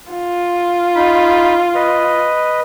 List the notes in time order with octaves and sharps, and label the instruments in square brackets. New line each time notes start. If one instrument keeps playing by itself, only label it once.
[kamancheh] F4
[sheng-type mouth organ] D#4 B5
B4 D#5